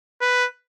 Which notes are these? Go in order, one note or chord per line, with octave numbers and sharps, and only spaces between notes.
B4